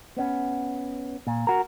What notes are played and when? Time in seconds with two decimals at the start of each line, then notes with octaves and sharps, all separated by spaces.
0.17 B3 C#4
1.27 A#2
1.47 F#4 A#4